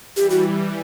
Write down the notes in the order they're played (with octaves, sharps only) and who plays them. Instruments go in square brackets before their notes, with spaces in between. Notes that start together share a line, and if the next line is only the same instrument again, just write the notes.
[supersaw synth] E3 G3 [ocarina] G4
[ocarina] F#4